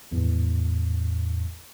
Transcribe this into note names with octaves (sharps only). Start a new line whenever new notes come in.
G#1 E2 A2